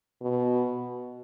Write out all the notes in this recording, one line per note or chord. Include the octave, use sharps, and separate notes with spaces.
B2